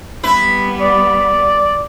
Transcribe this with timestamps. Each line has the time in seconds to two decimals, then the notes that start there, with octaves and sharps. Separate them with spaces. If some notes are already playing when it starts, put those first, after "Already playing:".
0.23 G3 B3 E4 B4
0.81 D5